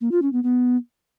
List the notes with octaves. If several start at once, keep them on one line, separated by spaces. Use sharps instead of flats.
A#3
F4
C#4
B3
B3